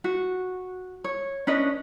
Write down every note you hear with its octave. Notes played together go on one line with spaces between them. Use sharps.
F#4
C#5
C#4 D4 B4 D#5